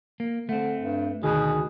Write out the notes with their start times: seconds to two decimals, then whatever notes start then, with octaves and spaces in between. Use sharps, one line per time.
0.20 A#3
0.49 D3 A3 C4
0.81 G2
1.23 D2 B2 D#3 G#4